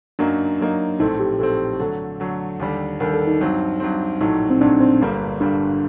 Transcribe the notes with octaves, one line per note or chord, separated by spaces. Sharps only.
F#2 F#3 A#3 D4 D#4
F#2 F#3 A#3 D#4
A#1 A2 A3 C4 D#4
G4
A#1 A2 A3 C4 A4
D3 F#3 A3
D3 F#3 A3
D#2 D3 G3
D#2 D3 G3 A#4
A4
D#4
G2 F#3 C4
G2 F#3 C4
A#1 A2 F#3 D#4
C4
A#1 A2 F#3 D4
C4
G1 G2 D3 G3 A#3
G1 G2 D3 G3 A#3 D4